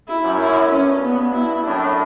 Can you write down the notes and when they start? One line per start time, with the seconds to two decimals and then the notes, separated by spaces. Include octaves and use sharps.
0.08 E4
0.24 F#2
0.40 E4
0.71 G2 C#4
1.03 B3
1.35 E4
1.66 F#2 A2 D4